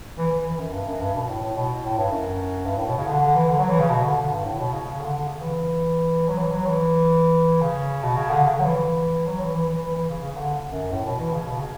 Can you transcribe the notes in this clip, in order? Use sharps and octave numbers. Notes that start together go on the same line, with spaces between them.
E3
E3
E3
F#2
G2
F#2
G2
B2
A2
A2
B2
A2
G2
F#2
G2
A2
B2
C#3
D3
D3
E3
D3
F#3
E3
C#3
B2
D3
D3
G2
A2
B2
C#3
C#3
D3
D3
C#3
E3
F#3
E3
F#3
E3
C#3
B2
C#3
D3
C#3
D3
F#3
E3
E3
F#3
E3
E3
E3
E3
E3
C#3
C#3
D3
F#2
A2
B2
E3
C#3
B2
C#3